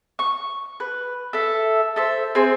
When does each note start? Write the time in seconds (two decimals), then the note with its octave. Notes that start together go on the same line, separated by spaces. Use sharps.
0.19 C#6
0.80 B4
1.33 A4 E5
1.96 A4 C5 E5
2.35 C4 G#4 C5